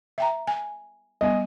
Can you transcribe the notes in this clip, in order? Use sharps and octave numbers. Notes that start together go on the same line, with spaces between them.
E5 G5 A#5
G#5
G3 B3 D#5 G#5